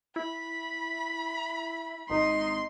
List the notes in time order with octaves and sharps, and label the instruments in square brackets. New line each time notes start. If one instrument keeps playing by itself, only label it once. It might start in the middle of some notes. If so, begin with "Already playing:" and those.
[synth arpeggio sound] E4 [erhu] B5
[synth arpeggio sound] G#1 [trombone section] D#4 [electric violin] C6